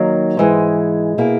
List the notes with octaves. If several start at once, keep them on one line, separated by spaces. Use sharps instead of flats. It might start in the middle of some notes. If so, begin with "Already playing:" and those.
Already playing: D#3 F#3 A#3
G#2 E3 G#3
B2 A#3 E4 G#4